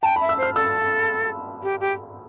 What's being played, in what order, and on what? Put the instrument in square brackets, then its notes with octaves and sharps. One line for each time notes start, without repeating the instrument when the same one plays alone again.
[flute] G5 [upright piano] A5
[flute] E5 [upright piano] B5
[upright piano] E6
[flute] C5 [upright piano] F6
[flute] A4 [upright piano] E6
[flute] G4
G4